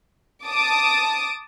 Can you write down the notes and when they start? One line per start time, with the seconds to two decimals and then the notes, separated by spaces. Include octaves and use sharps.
0.45 A5 D6 D#6